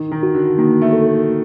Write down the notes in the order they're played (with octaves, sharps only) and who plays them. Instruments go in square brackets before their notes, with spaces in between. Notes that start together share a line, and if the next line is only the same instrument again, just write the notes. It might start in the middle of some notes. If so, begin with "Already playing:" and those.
Already playing: [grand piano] D#3 [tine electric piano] D#4
[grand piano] D#3
[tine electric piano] F#4
[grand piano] D3
[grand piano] D#3 [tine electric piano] A#3
[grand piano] A3
[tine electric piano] A4